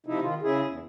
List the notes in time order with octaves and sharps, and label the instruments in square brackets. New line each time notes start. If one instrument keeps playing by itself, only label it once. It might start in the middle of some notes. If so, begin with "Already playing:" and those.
[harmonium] C3 F3 D#4 E4
D#3 F4
C#3 E4 G#4
E2